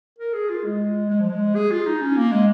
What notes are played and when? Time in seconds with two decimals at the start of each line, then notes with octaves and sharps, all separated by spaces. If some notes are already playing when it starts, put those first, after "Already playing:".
0.19 A#4
0.34 G#4
0.50 F4
0.64 G#3
1.10 G#3
1.20 F3
1.29 G#3
1.55 G#4
1.71 F4
1.86 D#4
2.01 C#4
2.17 A#3
2.32 G#3